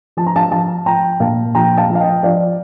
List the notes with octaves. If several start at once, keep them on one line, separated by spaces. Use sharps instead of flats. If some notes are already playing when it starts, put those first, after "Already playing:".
F3 A5
A#5
F5 A5
F3 F5 A5
F3 G5 A#5
A#2 F5 A5
F3 G5 A#5
F5 A5
F3
F5
D#5 G5
F3 D5 F5